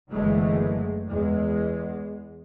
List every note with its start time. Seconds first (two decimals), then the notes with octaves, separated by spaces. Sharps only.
0.11 F#1 D3 E3 F#3 G#3 A3
1.08 E2 G#3